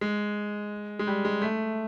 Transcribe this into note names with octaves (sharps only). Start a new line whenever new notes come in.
G#3
G#3
G3
G#3
A3